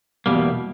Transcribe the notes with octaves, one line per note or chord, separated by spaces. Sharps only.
E2 B2 G3 A#3